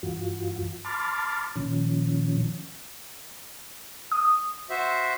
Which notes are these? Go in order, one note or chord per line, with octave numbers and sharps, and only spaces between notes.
G2 E3 F4 F#4
A5 B5 C6 D6 F6 A6
A#2 D#3 F3 C#4
D#6
F#4 C5 E5